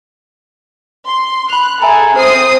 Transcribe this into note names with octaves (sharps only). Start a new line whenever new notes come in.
C6
B5 F#6 F7
G#4 A4 E5 G#5 A#5
C4 C5 D#6 C7